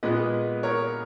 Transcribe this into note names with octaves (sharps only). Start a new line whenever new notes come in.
A#2 G#3 B3 B4 D#5
A#4 C#5